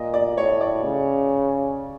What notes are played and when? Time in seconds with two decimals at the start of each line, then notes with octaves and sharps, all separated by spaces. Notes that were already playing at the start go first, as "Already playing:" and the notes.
Already playing: A#2 D#5
0.14 D5
0.37 A2 C#5
0.61 D5
0.84 C#3